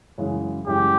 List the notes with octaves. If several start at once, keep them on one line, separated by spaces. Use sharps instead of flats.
F#2 C#3 E3 G#3
F#2 C#3 E3 G#3 G4